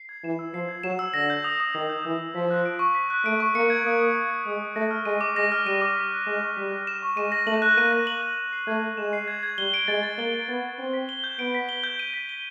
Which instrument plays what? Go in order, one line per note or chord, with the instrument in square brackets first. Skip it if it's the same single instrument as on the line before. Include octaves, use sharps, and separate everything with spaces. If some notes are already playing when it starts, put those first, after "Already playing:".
Already playing: [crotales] C7
G#6
[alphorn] E3 [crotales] E7
[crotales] E6
[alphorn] F3 [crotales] C7
[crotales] G#6
[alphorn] F#3 [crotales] E7
[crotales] E6
[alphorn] D3 [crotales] A#6
[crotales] G6
D#6
D#6
[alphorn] D#3 [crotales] A#6
[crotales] G6
[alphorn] E3 [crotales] D#6
[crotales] D#6
[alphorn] F3 [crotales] B6
[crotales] F#6
D7
C#6
B6
F#6
[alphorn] A3 [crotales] D7
[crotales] C#6
[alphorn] A#3 [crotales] C#7
[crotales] G#6
[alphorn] A#3 [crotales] D#6
[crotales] D#6
C#7
G#6
[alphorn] G#3 [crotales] D#6
[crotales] D#6
[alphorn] A3 [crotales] A#6
[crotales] F6
[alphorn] G#3 [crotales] D#7
[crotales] D6
[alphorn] G#3 [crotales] A#6
[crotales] F6
[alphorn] G3 [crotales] D#7
[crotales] D6
B6
F#6
[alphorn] G#3 [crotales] E7
[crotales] C#6
[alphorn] G3 [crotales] B6
[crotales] F#6
E7
C#6
[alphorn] G#3 [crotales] D#7
[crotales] A#6
[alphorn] A3 [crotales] F#7
[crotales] F#6
[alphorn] A#3 [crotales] D#7
[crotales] A#6
F#7
F#6
E7
C7
[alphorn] A3 [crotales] G#6
[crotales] G#6
[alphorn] G#3 [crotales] E7
[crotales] C7
G#6
G#6
[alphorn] G3 [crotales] G7
[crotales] D7
[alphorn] G#3 [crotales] A6
[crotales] A6
[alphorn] A#3 [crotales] G7
[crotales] D7
[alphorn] B3 [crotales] A6
[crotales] A6
[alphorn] C4 [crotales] D7
[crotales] B6
G7
G6
[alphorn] B3 [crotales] D7
[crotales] B6
G7
G6
D#7
B6
G7